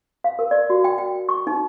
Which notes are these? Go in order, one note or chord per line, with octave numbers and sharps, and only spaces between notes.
F5
A#4
D5
F#4
G5
G5
C#6
D#4